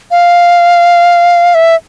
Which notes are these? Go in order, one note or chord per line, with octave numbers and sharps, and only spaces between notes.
F5
E5